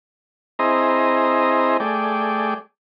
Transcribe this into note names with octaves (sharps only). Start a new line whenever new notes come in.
C4 E4 G#4 C5 D#5 A#5
A3 G#4 D5 G5